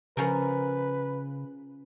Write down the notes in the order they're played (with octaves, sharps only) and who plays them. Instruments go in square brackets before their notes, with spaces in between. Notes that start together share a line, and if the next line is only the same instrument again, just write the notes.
[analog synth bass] C#3 [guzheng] F3 C#4 A#4 [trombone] B4